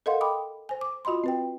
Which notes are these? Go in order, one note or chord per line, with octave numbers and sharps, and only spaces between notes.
A4 A#4 D#5 F5 F#5 C6
G5 B5 D6 D#6
C5 G#5
D6
F4 F#4 D#5 B5 C6
C4 B4 G5